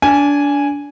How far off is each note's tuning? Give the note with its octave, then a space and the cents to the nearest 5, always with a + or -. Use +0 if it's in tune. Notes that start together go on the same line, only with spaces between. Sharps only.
D4 -25 G#5 -5